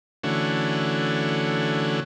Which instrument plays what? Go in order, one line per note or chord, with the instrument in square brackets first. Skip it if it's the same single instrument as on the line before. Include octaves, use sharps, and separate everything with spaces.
[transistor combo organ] D3 E3 A3 C#4 F#4